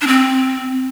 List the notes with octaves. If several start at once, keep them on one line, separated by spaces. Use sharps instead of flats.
D4
C4